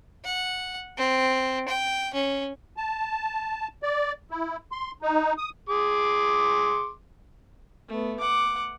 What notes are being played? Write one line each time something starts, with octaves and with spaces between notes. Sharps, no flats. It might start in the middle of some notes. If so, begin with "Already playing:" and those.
F#5
C4
G5
C#4
A5
D5
E4
C6
D#4
D#6
G#4 C6 D6
A3 B3
F#5 D6